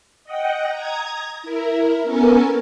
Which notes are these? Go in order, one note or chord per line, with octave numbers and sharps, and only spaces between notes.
D#5 F#5 G5
A#5 D#6 G#6
E4 A#4
B3 C#4 A4 A#4 G#5 A5